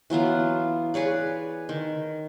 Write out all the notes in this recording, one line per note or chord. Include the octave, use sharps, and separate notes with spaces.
E3 F#3 B3 F4
G#4 B4 C#5 D5
D#3